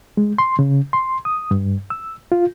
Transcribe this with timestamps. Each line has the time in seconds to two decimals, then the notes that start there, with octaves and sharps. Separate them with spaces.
0.17 G#3
0.38 C6
0.59 C#3
0.93 C6
1.25 D#6
1.51 G2
1.90 E6
2.32 F4